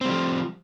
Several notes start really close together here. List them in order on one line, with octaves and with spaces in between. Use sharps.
C4 G3 F3